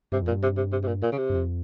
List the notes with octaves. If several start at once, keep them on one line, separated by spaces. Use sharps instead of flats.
G2 C3
F2
A#2
G2
C3
C3
C3
C3
A#2
A#2
C#3
C3
G2
F2